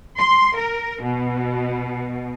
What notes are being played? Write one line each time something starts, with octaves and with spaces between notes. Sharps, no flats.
C6
A#4
B2